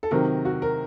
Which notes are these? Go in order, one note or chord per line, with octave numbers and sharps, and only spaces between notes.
A4
C3 D#3 F#3 A#4
F#4
A#4